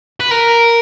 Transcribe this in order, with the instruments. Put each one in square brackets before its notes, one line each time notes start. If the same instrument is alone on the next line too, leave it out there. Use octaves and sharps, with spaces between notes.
[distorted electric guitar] B4
A#4